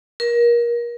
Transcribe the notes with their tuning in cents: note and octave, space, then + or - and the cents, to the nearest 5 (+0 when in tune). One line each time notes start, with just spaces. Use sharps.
A#4 +25